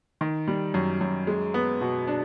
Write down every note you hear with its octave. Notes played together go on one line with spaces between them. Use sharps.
D#3
G3
F#2
F#2
G#3
B3
B2
D4